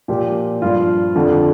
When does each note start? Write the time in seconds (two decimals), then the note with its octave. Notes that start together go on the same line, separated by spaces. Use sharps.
0.08 A#2 F3 G4
0.62 G2 F3 F4
1.16 F2 D3 F3